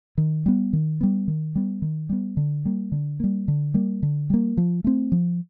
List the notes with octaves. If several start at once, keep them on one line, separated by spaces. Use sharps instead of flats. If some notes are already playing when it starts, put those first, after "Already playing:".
D#3
G3 B3
D#3
G3 B3
D#3
G3 B3
D#3
G3 B3
D3
G3 A#3
D3
G3 A#3
D3
G3 A#3
D3
G3 A#3
F3
A3 C4
F3